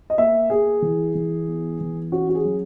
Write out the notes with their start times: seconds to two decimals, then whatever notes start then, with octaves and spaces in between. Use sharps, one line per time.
0.10 D#5
0.18 A#3 E5
0.50 A#3 G#4
0.82 E3
1.15 E3
1.48 B3
1.80 E3
2.12 C#4 F#4
2.29 F#4
2.35 G#4
2.45 F#3